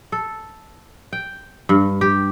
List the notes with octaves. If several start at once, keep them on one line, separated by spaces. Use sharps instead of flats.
A4
G5
G2
G4